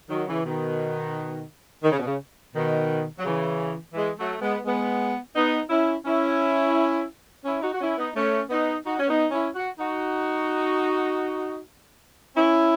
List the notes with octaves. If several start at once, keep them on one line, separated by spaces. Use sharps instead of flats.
D#3 F#3
C#3 E3
B2 D#3
D#3
C#3
B2
C#3
B2 D#3
F#3
C#3 E3
E3 G#3
F#3 A3
G#3 B3
G#3 B3
B3 D#4
C#4 E4
C#4 E4
C#4 E4
D#4 F#4
F#4
C#4 E4
B3 D#4
A3 C#4
B3 D#4
D#4 F#4
C#4
B3 D#4
C#4 E4
F#4
D#4 F#4
C#4 E4